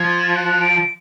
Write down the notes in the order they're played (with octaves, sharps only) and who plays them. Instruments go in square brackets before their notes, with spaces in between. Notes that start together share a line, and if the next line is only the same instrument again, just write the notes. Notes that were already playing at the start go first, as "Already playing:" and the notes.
Already playing: [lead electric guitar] F3 [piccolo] G#6
[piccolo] F#6
D7